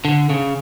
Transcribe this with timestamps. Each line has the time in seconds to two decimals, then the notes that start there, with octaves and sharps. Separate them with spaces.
0.05 D3
0.30 C#3